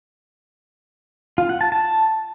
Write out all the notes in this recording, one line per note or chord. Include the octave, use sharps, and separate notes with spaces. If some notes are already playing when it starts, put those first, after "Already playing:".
F4
F#5
A5
A5